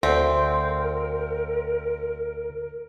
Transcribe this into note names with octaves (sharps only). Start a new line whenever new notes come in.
D2 C4 A#4